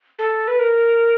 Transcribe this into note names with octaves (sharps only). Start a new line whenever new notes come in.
A4
B4
A#4